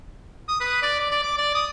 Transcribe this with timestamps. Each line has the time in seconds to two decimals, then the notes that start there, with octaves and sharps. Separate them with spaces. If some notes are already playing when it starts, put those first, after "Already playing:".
0.49 D#6
0.61 B4
0.83 D5
1.00 D5
1.11 D5
1.23 D6
1.38 D5
1.55 D#6